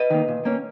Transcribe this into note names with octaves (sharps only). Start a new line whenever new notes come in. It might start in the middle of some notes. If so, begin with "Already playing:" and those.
Already playing: B4 D#5
D#3 A#3
A#2
A#3 C#4